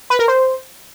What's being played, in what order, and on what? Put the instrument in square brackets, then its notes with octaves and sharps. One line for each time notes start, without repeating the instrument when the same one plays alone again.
[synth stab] B4
A#4
C5